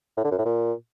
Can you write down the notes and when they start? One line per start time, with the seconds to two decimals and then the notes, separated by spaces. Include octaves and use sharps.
0.17 A2
0.24 D3
0.31 F#2
0.38 A2
0.45 A#2